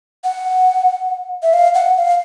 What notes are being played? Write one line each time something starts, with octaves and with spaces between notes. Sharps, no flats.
F#5
E5
F5
F#5
F5